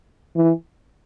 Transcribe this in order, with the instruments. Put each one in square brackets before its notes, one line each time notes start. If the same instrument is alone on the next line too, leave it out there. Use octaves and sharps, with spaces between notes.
[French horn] E3